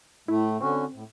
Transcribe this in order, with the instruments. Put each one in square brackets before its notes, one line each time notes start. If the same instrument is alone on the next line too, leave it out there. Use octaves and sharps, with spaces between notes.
[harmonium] A2 A3 [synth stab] E4
[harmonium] D3 C#4 F#4 [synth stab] C4
[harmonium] A2